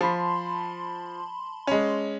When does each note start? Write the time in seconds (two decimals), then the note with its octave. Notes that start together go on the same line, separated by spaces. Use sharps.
0.01 F3 A5 B5 C6
1.67 G#3 C#4